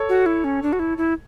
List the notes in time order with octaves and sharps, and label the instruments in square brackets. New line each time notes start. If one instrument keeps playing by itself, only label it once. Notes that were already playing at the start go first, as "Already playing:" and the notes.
Already playing: [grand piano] A4 C#5
[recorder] F#4
E4
C#4
D4
F#4
E4
E4